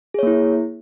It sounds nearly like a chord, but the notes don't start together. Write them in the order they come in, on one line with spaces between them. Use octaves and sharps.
G#4 C#5 A#3 E4